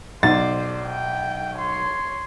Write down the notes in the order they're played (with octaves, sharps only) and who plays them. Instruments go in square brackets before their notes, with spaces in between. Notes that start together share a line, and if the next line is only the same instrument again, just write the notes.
[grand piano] B1 A6 [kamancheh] C5 D5
[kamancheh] G5
C#5 C6